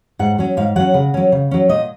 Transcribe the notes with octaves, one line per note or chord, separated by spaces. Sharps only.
G#2 F#5
F#3 C#4
G#2 F5
F#3 C#4 F#5
C#3
F#3 C#4
C#3
F#3 C#4
A#2 D#5